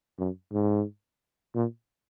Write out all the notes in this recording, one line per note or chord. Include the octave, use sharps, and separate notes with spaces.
F#2
G#2
A#2